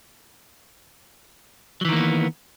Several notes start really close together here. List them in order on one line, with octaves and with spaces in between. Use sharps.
F#3 E3 D#3 A#3 B3